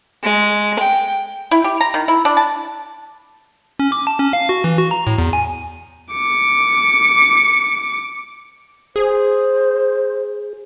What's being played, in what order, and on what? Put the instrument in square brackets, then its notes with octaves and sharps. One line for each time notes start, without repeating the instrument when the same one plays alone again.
[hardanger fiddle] G#3
G5
[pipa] E4
G4
A#5
D#3
E4
D4
A5
[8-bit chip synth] C#4
D6
A5
C#4
F5
F#4
E3
F#4
A#5
A2
E2
G#5
[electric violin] D6 C#7
[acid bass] G#4 [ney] C5